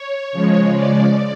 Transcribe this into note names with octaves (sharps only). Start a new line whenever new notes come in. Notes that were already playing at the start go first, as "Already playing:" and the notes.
Already playing: C#5
C#3 F3 G#3
D5